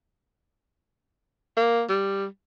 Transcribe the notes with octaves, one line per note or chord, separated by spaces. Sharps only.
A#3
G3